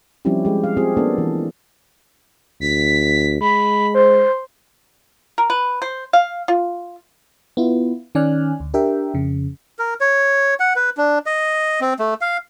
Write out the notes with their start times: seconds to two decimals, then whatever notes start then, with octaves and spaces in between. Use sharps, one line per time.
0.25 F3 G3 C4 C#4 E4 G4
0.45 G#3 G4
0.64 F5
0.77 C4 F4 G4 G#4
0.97 A#3 B3 D4 A4
1.18 E3
2.61 D2 B6
3.41 G#3 B5
3.94 C5
5.38 A#4
5.50 B4
5.82 C5
6.13 F5
6.48 F4
7.57 B3 E4 F4
8.15 D#3 C#4 D5 G#5 F6 F#6
8.60 D2
8.74 D4 G4 A#4 E5 G5
9.14 F2 C#3
9.79 A#4
10.01 C#5
10.60 F#5
10.76 B4
10.97 D4
11.26 D#5
11.81 C4
11.99 A3
12.21 F5